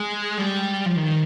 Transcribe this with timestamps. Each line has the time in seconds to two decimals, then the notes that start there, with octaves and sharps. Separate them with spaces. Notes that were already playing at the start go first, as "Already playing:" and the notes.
Already playing: G#3
0.38 G3
0.86 F3
0.96 D#3